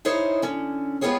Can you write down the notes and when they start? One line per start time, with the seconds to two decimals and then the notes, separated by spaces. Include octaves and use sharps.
0.05 D#4 E4 G#4 C5 C#5 D#5
0.42 D3 C#4
1.01 G#3 B3 F4 G4 G#4 C#5